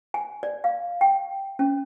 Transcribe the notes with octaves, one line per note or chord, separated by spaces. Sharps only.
G#5
D5
F5
G5
C#4